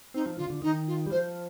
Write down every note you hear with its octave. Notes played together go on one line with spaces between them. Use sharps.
C4 D#4
F3
D3 F4
D3
D#3 D#4
F4
G3
F3 C5